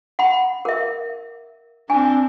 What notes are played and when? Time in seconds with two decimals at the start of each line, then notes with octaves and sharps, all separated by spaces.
0.19 F#5 B5
0.65 A#4 E5
1.90 C4 D4 G#5